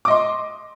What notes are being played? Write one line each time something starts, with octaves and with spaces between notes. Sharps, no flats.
D#5 C6 D6